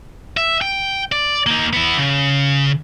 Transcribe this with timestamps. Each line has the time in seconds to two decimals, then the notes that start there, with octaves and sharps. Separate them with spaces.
0.37 E5
0.62 G5
1.12 D5
1.46 A#3 D#4
1.73 B3 E4
1.98 C#3